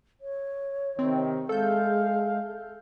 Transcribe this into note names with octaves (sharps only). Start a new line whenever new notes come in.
C#5
C3 D#3 C4
G#3 G#4 A4 E5 F5 G6